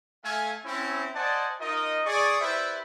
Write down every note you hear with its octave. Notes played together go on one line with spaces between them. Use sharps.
A3 F5 G#5
C4 C#4 E4
C5 D5 D#5 F#5 G#5 A5
D#4 F4 A#4 D#5
G#4 D5 C#6
E4 G4 B4 C5 D5 E5